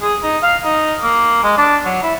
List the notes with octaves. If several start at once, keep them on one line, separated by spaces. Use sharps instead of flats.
G#4
D#4
F5
D#4
A#3
G#3
D4
F#3
E4